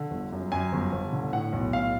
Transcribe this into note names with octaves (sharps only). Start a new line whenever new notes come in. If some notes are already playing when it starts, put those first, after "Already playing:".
Already playing: D3
G1
F#2
F#2 G#5
G1
G1
D3
A2 F#5
B1
A2 F5